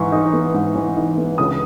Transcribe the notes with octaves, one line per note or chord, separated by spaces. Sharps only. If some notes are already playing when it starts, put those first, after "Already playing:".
Already playing: G#2 E3 C#6
D#4
B3
G#2
E3
D#4
B3
C#2 D#6